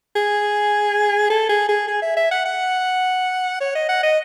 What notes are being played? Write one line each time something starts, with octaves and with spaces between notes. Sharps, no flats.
G#4
A4
G#4
G#4
G#4
E5
E5
F#5
F#5
C#5
D#5
F#5
D#5